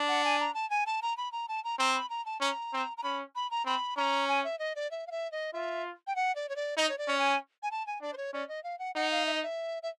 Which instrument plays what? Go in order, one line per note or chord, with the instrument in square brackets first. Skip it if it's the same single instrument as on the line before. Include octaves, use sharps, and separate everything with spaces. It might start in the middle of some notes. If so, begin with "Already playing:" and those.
Already playing: [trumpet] D4
[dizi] F#5
G#5
A#5
A5
G#5
A5
A#5
B5
A#5
A5
A#5
[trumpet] C4 [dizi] A#5
[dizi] B5
A#5
A5
[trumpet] C#4 [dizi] A#5
[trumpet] C4
[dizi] A#5
[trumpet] C#4 [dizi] B5
[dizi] B5
A#5
[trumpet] C4 [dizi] B5
[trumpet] C#4 [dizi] A#5
[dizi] G#5
E5
D#5
D5
E5
F5
E5
D#5
[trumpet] F4 [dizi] E5
[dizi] G5
F#5
D5
C#5
D5
[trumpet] D#4 [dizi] D#5
[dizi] C#5
D5
[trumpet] C#4
[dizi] G#5
G#5
A5
G#5
[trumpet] D4 [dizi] D5
[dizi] C5
C#5
[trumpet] C#4 [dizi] D5
[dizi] D#5
F5
F#5
[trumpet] D#4 [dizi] F#5
[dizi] F5
E5
D#5
E5
E5